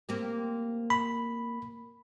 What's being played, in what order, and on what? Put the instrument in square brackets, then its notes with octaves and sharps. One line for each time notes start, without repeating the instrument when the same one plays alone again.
[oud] A#3 C4 G4
[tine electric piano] B5